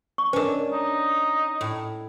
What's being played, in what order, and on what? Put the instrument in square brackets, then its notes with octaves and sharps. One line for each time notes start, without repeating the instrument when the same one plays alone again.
[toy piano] C#6
[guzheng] C#4 D4 [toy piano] A#4 B4
[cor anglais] D#4
[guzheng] A2